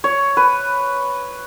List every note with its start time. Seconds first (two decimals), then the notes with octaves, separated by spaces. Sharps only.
0.04 C#5
0.37 B4